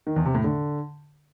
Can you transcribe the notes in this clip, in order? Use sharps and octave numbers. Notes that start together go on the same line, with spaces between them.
D#3
E2
C3
A2
D3